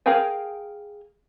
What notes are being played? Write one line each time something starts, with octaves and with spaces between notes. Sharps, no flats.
G#4 A#4 F5 G5 G#5